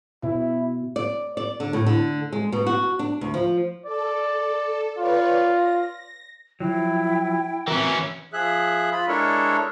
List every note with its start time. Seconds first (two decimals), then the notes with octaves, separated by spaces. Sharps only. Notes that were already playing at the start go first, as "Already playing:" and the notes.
0.23 B2 E4
0.96 D5
1.37 D5
1.60 D3
1.73 A2
1.86 D3
2.33 G#3
2.52 B2
2.67 F#4
2.99 D4
3.21 D2
3.34 F3
3.86 A4 D5
4.98 F4 B4 C#5 D5
5.52 A#6
6.60 F3 F#3 E4 G5
7.68 E3 C4 C#4 F#4 A#4 E5
8.33 F3 G#4 E5 F#6
8.92 F4 B5
9.08 G#3 D4 E4 A4 A#4 C#5